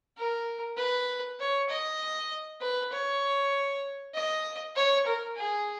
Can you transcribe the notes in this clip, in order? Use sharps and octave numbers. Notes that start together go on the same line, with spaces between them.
A#4
B4
C#5
D#5
B4
C#5
D#5
C#5
A#4
G#4